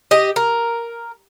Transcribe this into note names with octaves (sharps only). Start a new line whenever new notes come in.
G4 D#5
A#4